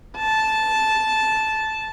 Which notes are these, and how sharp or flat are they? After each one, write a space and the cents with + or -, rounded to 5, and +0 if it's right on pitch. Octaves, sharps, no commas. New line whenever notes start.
A5 -10